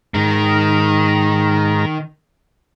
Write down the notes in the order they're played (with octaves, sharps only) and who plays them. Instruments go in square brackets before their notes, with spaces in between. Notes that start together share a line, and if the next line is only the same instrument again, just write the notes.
[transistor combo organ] G#2 A#5 [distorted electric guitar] D#3